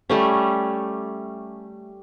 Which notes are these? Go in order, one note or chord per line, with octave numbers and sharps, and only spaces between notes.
G3 A3 C#4